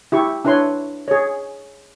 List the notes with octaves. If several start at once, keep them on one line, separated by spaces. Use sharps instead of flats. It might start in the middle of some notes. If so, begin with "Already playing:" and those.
E4 G4 C#6
D4 E4 B4 C#5 C6
G#4 C#5